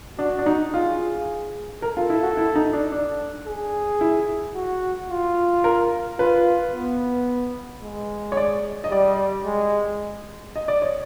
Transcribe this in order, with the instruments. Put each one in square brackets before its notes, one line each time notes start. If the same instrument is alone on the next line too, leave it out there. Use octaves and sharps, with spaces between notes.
[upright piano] D4 [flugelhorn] F#4
[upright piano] D4
D#4
[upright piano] F4 [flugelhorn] G#4
[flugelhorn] A4 [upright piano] A#4
[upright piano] F4
E4
F#4
E4
D#4
D4
D4
[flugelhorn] G#4
[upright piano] E4
[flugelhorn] F#4
F4
[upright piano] A#4
[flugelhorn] F4 [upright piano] B4
[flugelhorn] B3
G#3
[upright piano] C#5
D5
D#5
[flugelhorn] G3 [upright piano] D5
[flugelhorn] G#3
[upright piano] D#5
D5
C#5